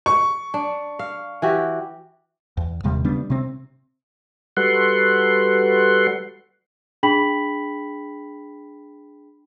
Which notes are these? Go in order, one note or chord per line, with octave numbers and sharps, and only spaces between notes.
C#6
D4
F5
E3 F#4 G4
E2
D#1 D#2 C3 G3
C#3 G3 B3 D4
C3 C4
G3 F#4 A4 B4 F#5 C6
D4 G#4 G5 B5 B6 F#7